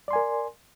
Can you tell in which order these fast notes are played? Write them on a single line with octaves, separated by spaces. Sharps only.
D5 C6 G#5 A#4